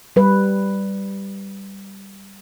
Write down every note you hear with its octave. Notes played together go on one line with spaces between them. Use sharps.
G3 B4